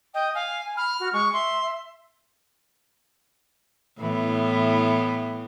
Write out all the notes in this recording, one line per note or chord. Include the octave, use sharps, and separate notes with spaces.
D#5 G5
F5 G#5
B5 F6
F#4
G#3 C#6
E5 C6
A2 E3 B3